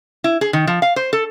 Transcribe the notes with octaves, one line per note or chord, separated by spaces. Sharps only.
E4
G#4
D#3
F3
F5
C5
A4